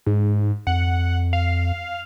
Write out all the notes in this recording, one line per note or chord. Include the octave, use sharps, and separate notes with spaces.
G#2
F2 F#5
F5